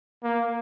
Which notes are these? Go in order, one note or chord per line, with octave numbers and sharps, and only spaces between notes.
A#3